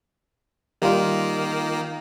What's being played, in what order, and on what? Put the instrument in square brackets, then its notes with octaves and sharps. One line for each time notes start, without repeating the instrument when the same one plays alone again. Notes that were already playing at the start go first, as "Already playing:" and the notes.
[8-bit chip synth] D#3 A#3 [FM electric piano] G3 F4